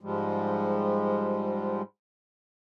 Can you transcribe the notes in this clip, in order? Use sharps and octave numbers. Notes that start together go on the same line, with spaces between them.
G#2 F3 G3 G#3